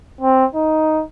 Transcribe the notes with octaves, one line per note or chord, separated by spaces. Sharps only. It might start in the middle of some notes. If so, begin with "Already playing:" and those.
C4
D#4